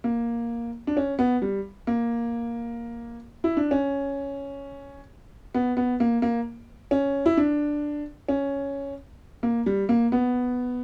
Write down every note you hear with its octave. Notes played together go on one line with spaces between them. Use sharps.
A#3
D4
C#4
B3
G3
A#3
E4
D4
C#4
B3
B3
A#3
A#3
C#4
E4
D4
C#4
A#3
G3
A#3
B3